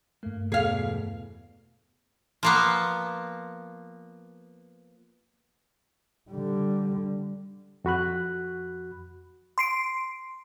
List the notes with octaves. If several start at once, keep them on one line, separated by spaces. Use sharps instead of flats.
G2 A3 A#3
E2 B2 E3 G#4 F5
F3 A#3 B3
D3 G3
F2 F#4 B5 F#6
C6 C7 D7